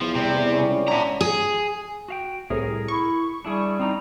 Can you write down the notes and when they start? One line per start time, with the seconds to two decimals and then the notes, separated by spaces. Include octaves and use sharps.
0.01 E2 F3
0.15 C3 G3 C4
0.34 E2
0.52 E3 G3 C#4
0.69 C#2
0.88 D3 F#3 B3 E5 A#5
1.21 G#4
2.08 F#4 F5 G5
2.50 C2 A2 G#4 A#4
2.88 E4 C#6
3.45 G3 D4 E4 G#4
3.79 C4 D#4 A#5